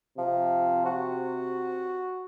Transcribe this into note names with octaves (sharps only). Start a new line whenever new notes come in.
C3 F3
F#4